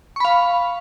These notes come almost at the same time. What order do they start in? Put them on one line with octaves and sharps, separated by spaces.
C#6 B5 F5